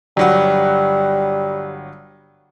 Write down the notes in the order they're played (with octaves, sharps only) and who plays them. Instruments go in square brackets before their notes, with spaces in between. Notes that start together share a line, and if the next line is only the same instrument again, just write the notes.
[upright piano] G1 F#3 F#5 [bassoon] G3